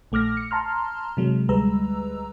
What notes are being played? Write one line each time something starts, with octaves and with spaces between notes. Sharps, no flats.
A#1 A3 D6 F6 A#6
C#7
A5 A#5 C6 F6
C3 F#3 G#3
D2 G3 G#3 B4 A#5 E6